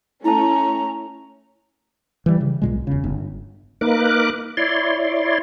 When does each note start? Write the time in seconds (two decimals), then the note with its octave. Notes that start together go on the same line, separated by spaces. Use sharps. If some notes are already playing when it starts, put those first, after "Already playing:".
0.24 A3 C#4 E4 A5 A#5
2.26 E3 G3
2.41 C#3
2.62 B1 A#2 G#3
2.87 E1 C#3
3.04 G1
3.81 A#3 D#4 A#4 B4 D6 F#6
4.57 E4 C#5 D5 C6